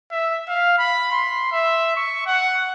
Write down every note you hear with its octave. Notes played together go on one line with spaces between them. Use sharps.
E5
F5
B5
C6
E5
C#6
F#5